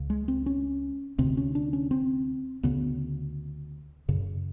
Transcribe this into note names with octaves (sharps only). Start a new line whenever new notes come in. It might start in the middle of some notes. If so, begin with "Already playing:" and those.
Already playing: C#2 C#3
G#3
C4
C#4
D2 C3 C4
C#4
D4
C#4
C4
D2 C#3 B3
F#2 C#3